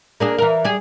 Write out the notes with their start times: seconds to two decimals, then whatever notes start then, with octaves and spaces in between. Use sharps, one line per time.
0.20 A#3 D4 G#4
0.38 E3 A#4
0.64 G3 G#4